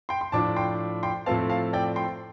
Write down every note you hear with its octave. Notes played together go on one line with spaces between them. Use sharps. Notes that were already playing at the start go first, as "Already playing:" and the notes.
G5 C6
C6
A2 F3 D4 A5 D6
G5 C6
G5 C6
A2 F3 A3 C4 F5 A5
F5 A5
D5 G5
G5 C6